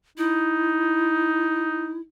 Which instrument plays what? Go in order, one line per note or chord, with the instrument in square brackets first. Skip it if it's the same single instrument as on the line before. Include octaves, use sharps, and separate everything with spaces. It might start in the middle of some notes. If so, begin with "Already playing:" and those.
[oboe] D#4 [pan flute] E4